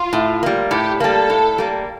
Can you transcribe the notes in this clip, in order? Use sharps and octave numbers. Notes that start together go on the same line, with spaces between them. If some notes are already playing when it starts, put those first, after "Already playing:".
Already playing: F4
A2
G3 A#3
A2 G4
G3 A#3 A4
A2
G3 A#3